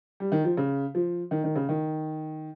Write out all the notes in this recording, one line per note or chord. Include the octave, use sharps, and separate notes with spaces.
G3
D#3
F3
C#3
F3
D#3
D#3
C#3
D#3